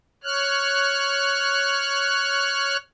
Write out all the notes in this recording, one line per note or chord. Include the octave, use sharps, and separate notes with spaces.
C#5 F6 F#6